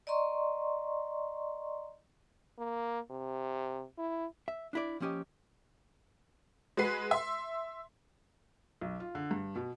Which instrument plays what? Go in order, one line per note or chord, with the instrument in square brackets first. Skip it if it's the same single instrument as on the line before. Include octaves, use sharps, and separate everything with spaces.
[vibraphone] D5 D#5 A#5 C6 C#6
[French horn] A#3
C3
E4
[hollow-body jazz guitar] E5
D4 E4 D5
F3 A#3 C#4 G4 D#5
[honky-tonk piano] G#3 F#4 B4 C7
E5 C6
[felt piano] B1
F4
D3
G2
B2